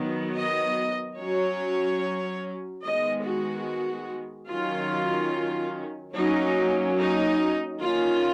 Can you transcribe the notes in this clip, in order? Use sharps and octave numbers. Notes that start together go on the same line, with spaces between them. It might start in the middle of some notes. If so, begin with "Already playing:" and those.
Already playing: D#3 F#3 B3
D#5
F#3 C#4 C#5
D#3 G#3 B3 D#5
F#4
D#3 F#3 C#4 F4
F#3 A#3 C#4 D#4
D#4
D#3 A#3 C#4 F4